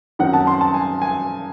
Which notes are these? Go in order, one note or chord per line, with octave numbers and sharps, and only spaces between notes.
F#2 D#3 F#3 C4 D#4 F#5
A5
C6
A5
G#5
G#5